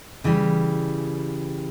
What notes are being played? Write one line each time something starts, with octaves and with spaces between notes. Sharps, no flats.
C#3 E3 G3